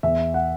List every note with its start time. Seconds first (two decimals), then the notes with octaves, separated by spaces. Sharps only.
0.03 E2 E5
0.34 F#5